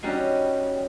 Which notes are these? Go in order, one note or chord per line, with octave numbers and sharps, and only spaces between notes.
G3 C#4 D#4 F#4 C6